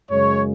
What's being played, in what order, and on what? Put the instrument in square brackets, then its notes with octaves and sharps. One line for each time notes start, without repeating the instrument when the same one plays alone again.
[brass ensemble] F#2 C#3 G#3 C#5